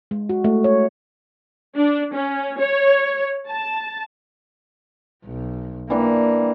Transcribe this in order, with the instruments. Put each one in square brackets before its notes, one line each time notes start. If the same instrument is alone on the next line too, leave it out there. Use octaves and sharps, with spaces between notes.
[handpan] G#3
F#4
A3
C#5
[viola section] D4
C#4
C#5
A5
[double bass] B1
[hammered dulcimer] E3 D4 G4 [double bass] A#3